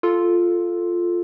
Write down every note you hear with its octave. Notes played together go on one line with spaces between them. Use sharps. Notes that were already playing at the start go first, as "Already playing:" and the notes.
F4 A4